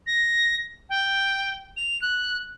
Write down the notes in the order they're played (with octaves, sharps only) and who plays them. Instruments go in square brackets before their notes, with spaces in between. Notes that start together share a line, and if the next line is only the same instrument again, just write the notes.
[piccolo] A#6
G5
F7
F#6